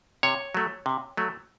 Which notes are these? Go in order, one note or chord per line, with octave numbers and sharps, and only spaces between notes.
C3 C#5
F#3 A3
C3
F#3 A3